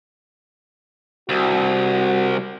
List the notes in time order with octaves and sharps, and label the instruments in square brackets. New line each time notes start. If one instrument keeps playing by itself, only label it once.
[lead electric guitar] C2 [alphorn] F#4